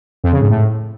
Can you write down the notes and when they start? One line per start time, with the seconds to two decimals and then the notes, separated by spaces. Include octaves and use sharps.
0.24 F2
0.32 C#3
0.41 G#2
0.50 A2